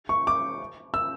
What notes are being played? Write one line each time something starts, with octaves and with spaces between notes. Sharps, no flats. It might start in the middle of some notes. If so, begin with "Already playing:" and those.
C#6
D6
E6